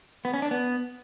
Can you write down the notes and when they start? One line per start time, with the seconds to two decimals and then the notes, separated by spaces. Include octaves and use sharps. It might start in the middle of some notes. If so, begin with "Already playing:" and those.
0.25 B3
0.34 C#4
0.42 D4
0.51 B3